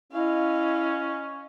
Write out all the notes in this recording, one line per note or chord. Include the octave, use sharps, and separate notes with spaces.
C#4 E4 D#5 F5